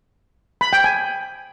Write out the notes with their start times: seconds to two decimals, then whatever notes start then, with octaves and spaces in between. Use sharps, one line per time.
0.61 B5
0.73 G5
0.84 G#5